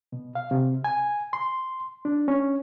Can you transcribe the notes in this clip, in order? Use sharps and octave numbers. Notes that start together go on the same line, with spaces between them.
B2
F5
C3
G#5
C6
D4
C#4